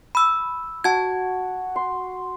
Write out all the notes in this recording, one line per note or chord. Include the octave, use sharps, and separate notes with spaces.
B5 E6
F#4 A5 G#6
C6